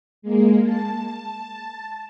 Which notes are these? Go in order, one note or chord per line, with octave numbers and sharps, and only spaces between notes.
G#3 A#3
A5